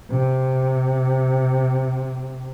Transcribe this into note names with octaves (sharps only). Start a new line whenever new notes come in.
C3